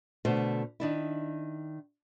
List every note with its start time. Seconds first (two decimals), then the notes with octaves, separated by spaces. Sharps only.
0.25 B2 D3 A3 C5
0.80 D#3 D4 E4